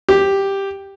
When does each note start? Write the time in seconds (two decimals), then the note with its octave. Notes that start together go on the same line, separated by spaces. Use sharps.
0.09 G4